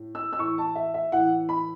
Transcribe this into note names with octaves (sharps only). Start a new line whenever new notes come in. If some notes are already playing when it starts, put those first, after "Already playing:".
Already playing: A2
E6
E6
A2 E3 C#6
A5
E5
E5
A2 E3 F#5
B5